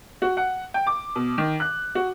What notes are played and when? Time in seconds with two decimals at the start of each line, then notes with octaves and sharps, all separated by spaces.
0.22 F#4
0.37 F#5
0.74 G5
0.87 D6
1.15 B2
1.38 D#3
1.60 F#6
1.95 F#4